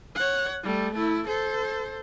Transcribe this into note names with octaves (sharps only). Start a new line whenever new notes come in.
C#5 F#5
G3 A3
A3 E4
A4 C5